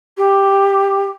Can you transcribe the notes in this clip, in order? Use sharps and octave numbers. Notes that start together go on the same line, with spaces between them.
G4